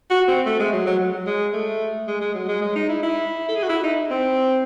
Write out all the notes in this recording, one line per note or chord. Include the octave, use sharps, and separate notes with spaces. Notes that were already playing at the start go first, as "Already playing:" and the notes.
F#4
C4
A3
G#3
F#3
F#3
G#3
A3
G#3
G#3
F#3
G#3
G#3
D#4
E4
E4
A4
G#4
F#4
E4
D#4
C4